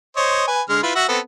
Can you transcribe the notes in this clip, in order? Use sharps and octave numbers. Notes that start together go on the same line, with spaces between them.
C5 C#5 D#5
B4 G#5
D3 G#3 F6
E4 F4 B4
F#4 E5 F#5
B3 C4 A4